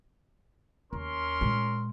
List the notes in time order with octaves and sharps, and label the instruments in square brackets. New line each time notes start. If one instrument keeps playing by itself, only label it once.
[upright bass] D#2 [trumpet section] C#4 A#4 C6
[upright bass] A#2 G#3